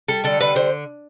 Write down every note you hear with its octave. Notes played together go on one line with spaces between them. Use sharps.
G3 A4
D3 A4
G3 B4
D3 C5